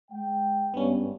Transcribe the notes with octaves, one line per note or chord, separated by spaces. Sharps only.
G#3 G5
G#1 G2 B3 C#4